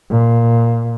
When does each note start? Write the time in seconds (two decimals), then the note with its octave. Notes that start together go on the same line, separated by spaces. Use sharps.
0.10 A#2